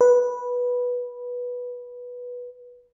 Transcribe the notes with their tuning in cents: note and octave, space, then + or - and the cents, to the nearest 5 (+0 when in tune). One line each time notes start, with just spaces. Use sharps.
B4 -10